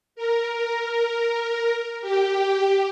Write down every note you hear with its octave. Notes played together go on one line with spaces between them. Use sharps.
A#4
G4